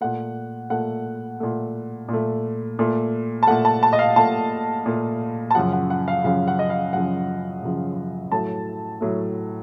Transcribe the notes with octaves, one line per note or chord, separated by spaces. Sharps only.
A#2 A3 F#5
A#2 A3 F#5
A#2 A3
A#2 A3
A#2 A3
A5
A#2 A3 F#5
A5
A5
D#5
F5
A#2 A3 A5
A#2 A3
A5
F#2 C#3 F3 F#5
F#5
F#5
F5
F#2 C#3 F3 F5
F#5
D#5
F5
F#2 C#3 F3 F#5
F#2 C#3 F3
A2 F#3 A3 A5
A2 F#3 A3